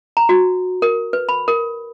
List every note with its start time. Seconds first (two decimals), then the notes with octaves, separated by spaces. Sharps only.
0.17 A#5
0.29 F#4
0.82 A#4
1.13 B4
1.29 B5
1.48 A#4